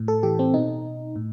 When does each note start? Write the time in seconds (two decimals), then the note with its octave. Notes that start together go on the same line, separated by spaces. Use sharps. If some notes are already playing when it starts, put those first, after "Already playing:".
Already playing: A2
0.08 A4
0.23 E3 G4
0.39 C4
0.54 B2 D#4
1.16 A2